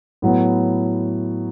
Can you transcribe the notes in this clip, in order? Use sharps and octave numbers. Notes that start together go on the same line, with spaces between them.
A2 F#3 B3